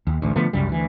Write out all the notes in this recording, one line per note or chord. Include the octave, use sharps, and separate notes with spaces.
D#2
A1 D2
D3 F3 A3 B3
C2 F#2 C#3 G3
D2 E3